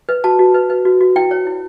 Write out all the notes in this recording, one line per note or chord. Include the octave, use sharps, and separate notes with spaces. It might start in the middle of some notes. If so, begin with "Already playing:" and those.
B4
F#4 A5
F#4
B4
B4
F#4
F#4
E4 G5
C#5
E4